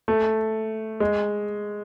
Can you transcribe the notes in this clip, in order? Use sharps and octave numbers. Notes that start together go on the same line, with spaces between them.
A3
G#3